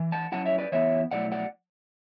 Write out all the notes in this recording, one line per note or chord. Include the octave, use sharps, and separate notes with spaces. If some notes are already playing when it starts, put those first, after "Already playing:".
Already playing: E3
F#5 A5
F#3 C#4 E4 F#5 A5
C#5 E5
B4 D5
E3 B3 E4 C#5 E5
B2 F#3 A3 E4 D5 F#5
D5 F#5